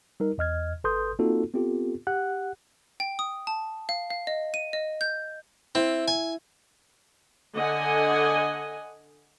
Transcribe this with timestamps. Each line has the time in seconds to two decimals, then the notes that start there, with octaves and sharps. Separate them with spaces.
0.20 G3 D#4 A#4
0.38 E2 D#5 F6 G#6
0.84 G#1 A4 B4 C6 D#6 G6
1.19 A#3 C4 D#4 F4 F#4 A4
1.54 B3 C4 F4 G4 A4
2.07 G4 F#5 F#6
3.00 G5
3.19 D#6
3.47 A5
3.89 F5
4.11 F5
4.27 D#5
4.54 D#7
4.73 D#5
5.01 G6
5.75 C4 E4
6.08 G#5
7.55 D3 D#5 F#5 G#5